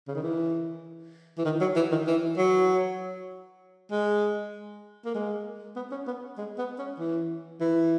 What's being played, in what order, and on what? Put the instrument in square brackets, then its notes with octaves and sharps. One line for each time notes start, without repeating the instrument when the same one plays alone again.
[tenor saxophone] C#3
D#3
E3
E3
D#3
F#3
E3
D#3
E3
F#3
G#3
A#3
G#3
B3
C#4
B3
G#3
B3
C#4
E3
E3